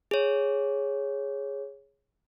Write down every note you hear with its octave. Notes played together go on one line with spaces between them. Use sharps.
G#4 C#5